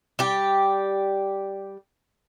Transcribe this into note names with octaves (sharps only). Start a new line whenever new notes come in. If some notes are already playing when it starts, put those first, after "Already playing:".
G3 G4